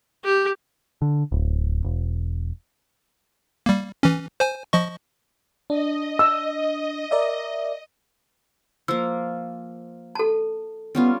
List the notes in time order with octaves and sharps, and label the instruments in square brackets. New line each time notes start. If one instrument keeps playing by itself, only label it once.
[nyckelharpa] G4
[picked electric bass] D3
D1
E1
[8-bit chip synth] G3 A#3
E3 C#4
C5 G#5
F3 D#5 C#6
[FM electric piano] D4 [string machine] D#5
[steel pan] E6
[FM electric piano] A#4 D5 E5
[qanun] F3 A#3 [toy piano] E6
[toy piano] A4 A5
[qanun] G3 C#4 F4 [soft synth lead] B3